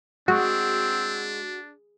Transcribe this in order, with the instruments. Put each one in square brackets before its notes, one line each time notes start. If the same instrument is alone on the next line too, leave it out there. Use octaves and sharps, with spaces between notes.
[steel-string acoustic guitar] G#3 [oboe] C4 [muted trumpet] D4 [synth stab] F#4